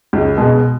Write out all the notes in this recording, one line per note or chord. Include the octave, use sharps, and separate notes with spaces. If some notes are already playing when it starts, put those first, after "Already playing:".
C#2
B2 G#3